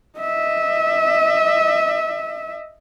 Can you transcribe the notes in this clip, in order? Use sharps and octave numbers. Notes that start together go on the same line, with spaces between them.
D#5 E5